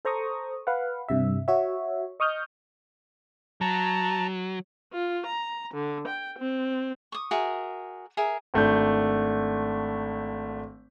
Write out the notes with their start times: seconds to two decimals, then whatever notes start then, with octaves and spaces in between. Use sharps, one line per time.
0.05 A4 C5 A#5 C#6 D#6
0.67 B4 F5 F#5
1.08 G2 C3 E5
1.48 F#4 C#5 E5
2.20 D#5 C#6 D#6 F6 G6
3.61 F#3 A5 A#5
4.93 F4
5.26 A#5
5.74 D3
6.08 G5
6.39 C4
7.12 C#6 D#6
7.31 F#4 G#4 A#4 E5
8.17 G#4 A#4 E5
8.54 G#1 A3 D4 G6